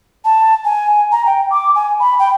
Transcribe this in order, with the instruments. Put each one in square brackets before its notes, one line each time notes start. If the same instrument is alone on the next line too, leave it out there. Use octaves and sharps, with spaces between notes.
[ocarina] A5
G#5
A#5
G5
D6
G#5
B5
G5